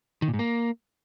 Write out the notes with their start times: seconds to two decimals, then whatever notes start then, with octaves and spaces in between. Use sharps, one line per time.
0.22 D#3
0.28 A#2
0.34 G#2
0.39 A#3